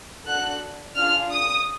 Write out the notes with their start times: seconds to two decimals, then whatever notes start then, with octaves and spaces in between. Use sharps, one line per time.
0.25 D4 F#4 A4 F#6
0.96 D4 F4 G#4 F6
1.32 D#6